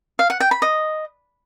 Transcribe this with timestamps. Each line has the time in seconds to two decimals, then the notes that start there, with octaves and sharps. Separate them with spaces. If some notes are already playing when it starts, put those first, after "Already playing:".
0.19 F5
0.30 F#5
0.40 G5
0.51 B5
0.62 D#5